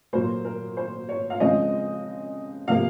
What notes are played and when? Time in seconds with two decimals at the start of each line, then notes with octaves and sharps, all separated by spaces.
0.13 A#2 F#3 A#3 C5
0.45 A#4
0.77 C5
1.09 C#5
1.30 F5
1.40 C#3 F3 G#3 C4 D#5
2.68 C3 F3 A#3 F5